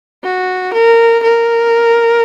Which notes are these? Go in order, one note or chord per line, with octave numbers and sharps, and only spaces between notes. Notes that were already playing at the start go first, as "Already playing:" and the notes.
F#4
A#4
A#4